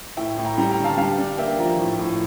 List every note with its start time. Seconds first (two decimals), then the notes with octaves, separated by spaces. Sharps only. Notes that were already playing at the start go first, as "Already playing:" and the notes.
0.17 A2 E5 G5
0.37 A2
0.45 G5 A#5
0.58 G3 G5 A#5
0.71 G5 A#5
0.78 D3
0.84 F5 A5
0.97 G3 F5 A5
1.18 D4
1.38 A#3 E5 G5
1.59 F3 G5 A#5
1.79 A2
1.99 A2